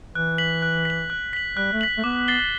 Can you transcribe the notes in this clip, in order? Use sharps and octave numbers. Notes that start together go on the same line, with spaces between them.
E3 F#6
B6 F#7
F#6
B6 F#7
F#6
B6 F#7
G3 F#6
A3
B6 F#7
A3
B3 D6
A6 C7 G7